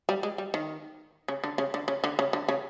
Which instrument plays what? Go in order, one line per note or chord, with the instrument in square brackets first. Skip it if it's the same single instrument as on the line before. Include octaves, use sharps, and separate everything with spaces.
[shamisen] G3
G#3
G3
D#3
C#3
D3
C#3
D3
C#3
D3
C#3
D3
C#3